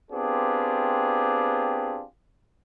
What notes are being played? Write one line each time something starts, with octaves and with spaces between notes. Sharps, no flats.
B3 C4 D4 F4 G4 G#4